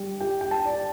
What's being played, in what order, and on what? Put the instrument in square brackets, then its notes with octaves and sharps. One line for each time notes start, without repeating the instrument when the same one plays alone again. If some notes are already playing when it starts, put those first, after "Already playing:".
Already playing: [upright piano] G3
[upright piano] G4 [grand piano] G5
[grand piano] G5
A5
[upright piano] D5